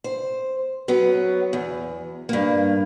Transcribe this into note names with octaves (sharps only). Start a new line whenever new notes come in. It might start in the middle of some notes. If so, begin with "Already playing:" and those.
C5
F#3 B3 C#4
E2
G2 A#3